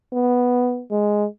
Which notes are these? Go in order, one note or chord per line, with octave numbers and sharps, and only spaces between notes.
B3
G#3